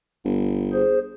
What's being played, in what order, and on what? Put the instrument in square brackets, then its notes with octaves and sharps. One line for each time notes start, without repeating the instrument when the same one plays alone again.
[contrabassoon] G1
[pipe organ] G#4 C5